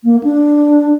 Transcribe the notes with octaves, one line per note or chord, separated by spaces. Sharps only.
A#3
D4